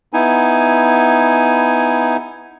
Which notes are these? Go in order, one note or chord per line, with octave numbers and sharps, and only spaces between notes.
B3 D#4 E4 G#5